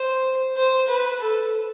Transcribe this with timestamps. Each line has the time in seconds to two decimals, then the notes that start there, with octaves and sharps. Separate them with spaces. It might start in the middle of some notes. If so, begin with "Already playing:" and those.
Already playing: C5
0.56 C5
0.88 B4
1.21 A4